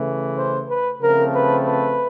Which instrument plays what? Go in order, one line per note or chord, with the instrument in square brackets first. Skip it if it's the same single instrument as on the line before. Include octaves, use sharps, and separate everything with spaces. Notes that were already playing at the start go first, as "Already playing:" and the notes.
Already playing: [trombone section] C#3 E3 A3
C5
B4
C#3 F3 A3 C4 A#4
B4
B4